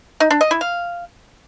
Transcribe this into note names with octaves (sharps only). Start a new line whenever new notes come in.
D#4
D4
D#5
E4
F5